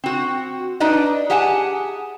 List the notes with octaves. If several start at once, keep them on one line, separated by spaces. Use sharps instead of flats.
C4 F#4
D4 D#4 B4 D5 D#5
G4 G#4 F#5 G#5 A5